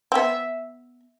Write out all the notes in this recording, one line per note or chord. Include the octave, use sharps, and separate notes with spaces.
C4
B3 E5